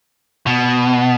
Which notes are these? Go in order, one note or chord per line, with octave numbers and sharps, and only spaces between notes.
B2